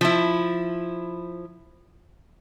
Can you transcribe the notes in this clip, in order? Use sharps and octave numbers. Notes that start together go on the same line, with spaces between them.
F3 E4